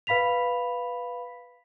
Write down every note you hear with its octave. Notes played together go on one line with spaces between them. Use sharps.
B4 F5 B5 B6 F7